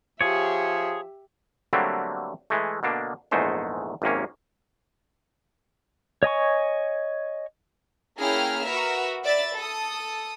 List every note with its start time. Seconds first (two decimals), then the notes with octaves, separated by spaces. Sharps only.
0.21 F3 G4 G#4 C#5 E5
1.73 D3 F#3 G3 A3 A#3 C4
2.50 E3 G#3 A3
2.83 B2 D3 A#3 D4
3.31 A#1 E2 G#2 G#3 A3 C5
4.02 G#1 F#2 C3 A#3 C#4
6.23 C#5 D#5 G#5 C#6
8.18 A#3 C#4 E4 G#4 G5 F6
8.63 F#4 A#4 B4 E5
9.24 D5 E5 B5 A6
9.55 A4 D#6